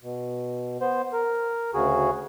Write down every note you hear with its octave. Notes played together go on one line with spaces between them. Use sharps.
B2
B3 C5
A#4
D2 C#3 F#4 G#4